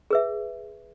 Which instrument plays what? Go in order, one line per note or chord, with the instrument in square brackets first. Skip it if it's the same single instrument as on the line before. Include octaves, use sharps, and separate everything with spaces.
[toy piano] G#4 B4 E5